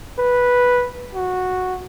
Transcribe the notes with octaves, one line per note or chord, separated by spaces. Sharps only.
B4
F#4